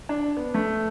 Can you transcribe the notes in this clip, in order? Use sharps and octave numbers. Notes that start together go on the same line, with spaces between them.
D4
B3
A3